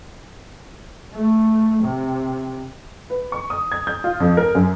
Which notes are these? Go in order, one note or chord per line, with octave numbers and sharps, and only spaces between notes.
A3
C3
B4
C#6
D#6
G#6
G6
F4
F2
A#4
F#2